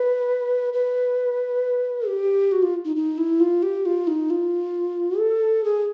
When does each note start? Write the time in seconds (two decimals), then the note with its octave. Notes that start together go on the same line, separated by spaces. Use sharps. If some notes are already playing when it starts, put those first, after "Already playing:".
Already playing: B4
0.73 B4
2.07 G4
2.52 F#4
2.62 F4
2.85 D#4
2.96 D#4
3.18 E4
3.40 F4
3.63 G4
3.86 F4
4.07 D#4
4.30 F4
5.19 A4
5.64 G#4